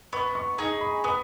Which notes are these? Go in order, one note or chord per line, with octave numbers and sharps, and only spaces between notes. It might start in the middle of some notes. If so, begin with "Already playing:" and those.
B3 C#6
C#6
D#4 G#4 A#5
B5
B3 D#6